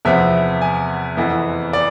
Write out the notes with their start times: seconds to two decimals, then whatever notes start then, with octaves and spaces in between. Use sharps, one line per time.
0.05 E2 C3 F3 B3 E5
0.62 G#5
1.17 F2 E3 B3
1.73 D5